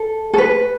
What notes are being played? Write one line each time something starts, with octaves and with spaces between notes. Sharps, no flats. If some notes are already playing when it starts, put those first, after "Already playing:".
Already playing: A4
A4
B4